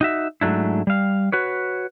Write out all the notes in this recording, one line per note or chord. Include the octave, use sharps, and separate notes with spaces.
D#4 F#4 E5
G#2 F#3 A3 D4 E4
G3 F5
F#4 B4 C#5